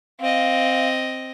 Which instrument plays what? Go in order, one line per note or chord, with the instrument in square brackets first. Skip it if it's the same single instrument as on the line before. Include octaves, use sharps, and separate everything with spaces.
[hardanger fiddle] C4 D#5 [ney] F5